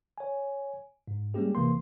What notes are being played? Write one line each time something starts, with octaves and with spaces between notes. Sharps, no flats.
C#5 G#5
G#2
G3 G#3 A#3 C#4 G4 G#4
A#1 C3 E3 A#3 C6